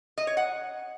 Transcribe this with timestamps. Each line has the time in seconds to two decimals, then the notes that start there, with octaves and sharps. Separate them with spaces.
0.18 D#5
0.27 C#5
0.37 F#5